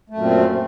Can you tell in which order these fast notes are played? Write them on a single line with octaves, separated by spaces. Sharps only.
A3 F#2 A#2 C4